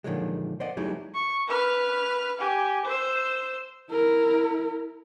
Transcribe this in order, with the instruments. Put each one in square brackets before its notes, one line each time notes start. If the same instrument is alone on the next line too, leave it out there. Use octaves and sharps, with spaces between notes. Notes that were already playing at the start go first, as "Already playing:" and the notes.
[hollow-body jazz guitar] A#2 D3 D#3 F3 F#3 G#3
C5 D5 D#5 F#5
F#3 G3 A3 D#4 E4 G#4
[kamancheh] C#6
B4 F6
G4 G#5
C5 E6
[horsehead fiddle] E4 A#4